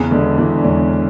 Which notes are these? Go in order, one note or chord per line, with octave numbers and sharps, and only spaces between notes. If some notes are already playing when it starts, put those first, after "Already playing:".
Already playing: E2 C#3
E1 D3
E1 E3
D4
E1 C#4